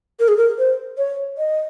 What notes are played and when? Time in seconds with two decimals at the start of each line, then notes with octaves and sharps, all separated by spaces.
0.20 A#4
0.28 G#4
0.38 A#4
0.59 C5
0.98 C#5
1.38 D#5